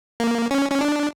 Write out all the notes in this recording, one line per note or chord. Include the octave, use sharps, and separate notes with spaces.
A#3
C#4
C#4
D4